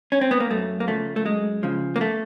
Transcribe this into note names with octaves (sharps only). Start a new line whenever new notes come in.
C#4
C4
B3
A#3
F#2 A3
A#3
C#3 F3 A3
A3
F#2 G#3
C#3 F3
A#3
A3